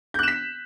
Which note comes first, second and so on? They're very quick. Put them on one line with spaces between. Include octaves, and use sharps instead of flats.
G6 F#6 E7 B6